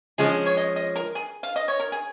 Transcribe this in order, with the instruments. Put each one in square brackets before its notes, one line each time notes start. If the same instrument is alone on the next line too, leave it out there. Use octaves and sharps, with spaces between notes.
[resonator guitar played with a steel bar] F3 G#3 C#4 [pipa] G#4
[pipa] C#5
D#5
D#5
A#4
G#4
F5
D#5
C#5
A#4
G#4